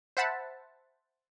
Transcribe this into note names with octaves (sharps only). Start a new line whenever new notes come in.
C5 E5 F#5 A5 B5